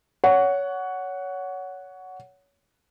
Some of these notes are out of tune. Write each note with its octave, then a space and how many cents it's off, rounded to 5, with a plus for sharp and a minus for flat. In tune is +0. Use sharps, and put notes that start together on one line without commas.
C#5 +20 F#5 +0